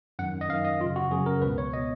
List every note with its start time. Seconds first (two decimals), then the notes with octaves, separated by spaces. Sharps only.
0.19 F#2 D#3 F#5
0.41 D#5
0.49 F#2 F5
0.53 D#3
0.65 D#5
0.80 F#2 F4
0.85 C#3
0.96 F#4
1.11 F#2 C#3 G#4
1.26 A#4
1.42 C#2 B2 B4
1.58 C#5
1.73 D#5
1.76 B2